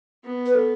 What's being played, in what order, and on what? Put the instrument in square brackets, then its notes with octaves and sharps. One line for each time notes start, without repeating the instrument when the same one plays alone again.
[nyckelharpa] B3
[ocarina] B4
A4